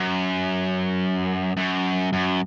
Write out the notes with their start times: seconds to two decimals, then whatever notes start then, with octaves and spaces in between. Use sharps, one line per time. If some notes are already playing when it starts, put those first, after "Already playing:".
Already playing: F#2
1.57 F#2
2.13 F#2